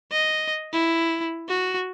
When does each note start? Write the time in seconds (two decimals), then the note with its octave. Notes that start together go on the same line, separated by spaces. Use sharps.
0.12 D#5
0.73 E4
1.49 F#4